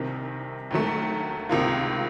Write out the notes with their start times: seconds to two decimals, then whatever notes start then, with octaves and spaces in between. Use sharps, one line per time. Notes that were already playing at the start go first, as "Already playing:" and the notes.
Already playing: C2 C3 D#3
0.71 D#2 D#3 F#3 A3
1.49 C#2 C3 D#3 A#3 F4